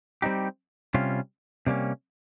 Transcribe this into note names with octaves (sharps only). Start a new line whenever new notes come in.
G3 C4 D#4 G4
C3 G3 C#4 F4
C3 G3 A#3 C#4